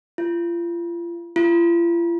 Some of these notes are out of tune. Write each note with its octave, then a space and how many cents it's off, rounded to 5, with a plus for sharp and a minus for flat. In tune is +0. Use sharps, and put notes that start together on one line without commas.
F4 -35
F4 -45